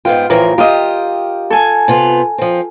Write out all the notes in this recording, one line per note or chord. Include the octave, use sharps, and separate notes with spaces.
G#2 B3 F4 G5
A2 E3 F3 A#4
F4 G4 D#5
A4 G#5
C3 B3 F4
F3 C4